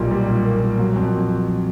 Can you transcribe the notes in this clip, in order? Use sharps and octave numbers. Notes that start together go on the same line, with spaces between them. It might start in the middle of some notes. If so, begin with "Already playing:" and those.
Already playing: B1 A#2 G3
G3
A#2
A#3
A#2
F#3
F2